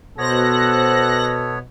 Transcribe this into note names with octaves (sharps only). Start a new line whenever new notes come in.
B2 B3 A4 C5 C#5 F#6 A#6